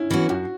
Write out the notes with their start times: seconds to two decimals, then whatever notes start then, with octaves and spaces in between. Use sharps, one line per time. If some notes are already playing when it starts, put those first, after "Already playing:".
Already playing: C#4 E4
0.11 E3 B3 C#4 F#4
0.29 F#2 F#4